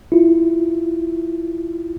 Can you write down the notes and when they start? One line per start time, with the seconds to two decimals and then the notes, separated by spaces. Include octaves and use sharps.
0.12 E4 F4